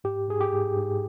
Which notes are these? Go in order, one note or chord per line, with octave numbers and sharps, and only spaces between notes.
G#2 G4
G#2 G#4
G4
G#2
G#2